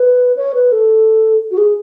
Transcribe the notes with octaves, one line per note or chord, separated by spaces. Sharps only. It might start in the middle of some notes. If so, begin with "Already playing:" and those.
Already playing: B4
C#5
B4
A4
F#4
G#4